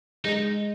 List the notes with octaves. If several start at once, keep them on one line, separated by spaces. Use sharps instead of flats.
G#3 D#4